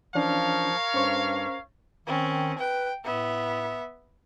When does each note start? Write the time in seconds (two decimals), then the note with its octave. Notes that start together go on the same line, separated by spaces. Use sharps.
0.15 E3 F3 C#4 D4 A#4 C#5 F5
0.94 G2 C#4 C5 C#6
2.07 D#3 C4 C#4
2.59 B4 G5
3.04 A2 B3 E5